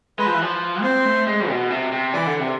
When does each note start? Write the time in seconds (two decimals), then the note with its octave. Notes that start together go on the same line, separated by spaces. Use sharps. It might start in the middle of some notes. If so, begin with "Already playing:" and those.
0.19 G#3 B4
0.26 F3
0.34 E3
0.42 F3
0.84 C4 C5
1.05 A3
1.27 G#3
1.49 B2
1.70 C3
1.92 C3
2.14 E3 D5
2.26 D3
2.40 C3